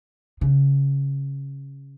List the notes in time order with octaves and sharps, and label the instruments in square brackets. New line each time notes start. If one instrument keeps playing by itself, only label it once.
[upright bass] C#3